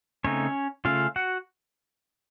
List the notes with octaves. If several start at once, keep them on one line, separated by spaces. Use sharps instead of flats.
C#3 A3 C4 C#4 D#4 C#5
C#3 A3 C#4 F4 F5
F#4 F#5